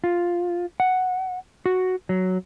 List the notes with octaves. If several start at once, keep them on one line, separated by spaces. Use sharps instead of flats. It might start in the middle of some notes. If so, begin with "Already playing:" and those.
F4
F#5
F#4
F#3